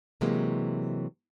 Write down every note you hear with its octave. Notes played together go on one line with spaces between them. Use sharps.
C3 E3 F#3 G#3 A#3